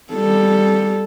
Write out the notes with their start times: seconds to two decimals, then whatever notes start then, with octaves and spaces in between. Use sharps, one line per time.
0.13 G3 A4